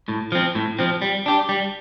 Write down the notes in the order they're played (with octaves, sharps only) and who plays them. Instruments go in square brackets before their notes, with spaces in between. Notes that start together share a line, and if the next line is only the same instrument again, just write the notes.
[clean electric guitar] A2
F3 C4
A2
F3 C4
G3
D4 G4
G3